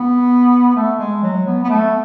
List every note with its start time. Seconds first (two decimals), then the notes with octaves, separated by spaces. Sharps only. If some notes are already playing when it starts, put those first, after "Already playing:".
Already playing: B3
0.76 A3
0.99 G#3
1.23 F#3
1.47 B3
1.64 B3
1.70 A3